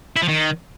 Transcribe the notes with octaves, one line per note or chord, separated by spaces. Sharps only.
E4
F3
D#3